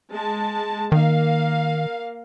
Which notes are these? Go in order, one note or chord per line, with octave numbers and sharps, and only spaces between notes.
G#3 A5
D#3 A#3 F5